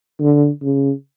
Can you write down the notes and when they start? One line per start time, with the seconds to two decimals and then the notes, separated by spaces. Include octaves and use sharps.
0.20 D3
0.62 C#3